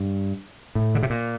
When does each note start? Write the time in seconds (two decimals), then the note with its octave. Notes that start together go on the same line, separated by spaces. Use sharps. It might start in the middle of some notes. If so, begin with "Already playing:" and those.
Already playing: G2
0.75 A2
0.95 D3
1.03 C3
1.10 A#2